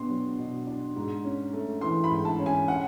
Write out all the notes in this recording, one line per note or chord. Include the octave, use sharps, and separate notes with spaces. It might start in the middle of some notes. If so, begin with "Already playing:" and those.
Already playing: B2 B3 D4 C6
F#3
B2
D4
G#2
C#4
A3
E3 C6
B5
G#2
A5
C#4
G#5
F#5